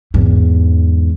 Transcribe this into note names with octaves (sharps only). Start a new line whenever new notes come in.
E2 G#2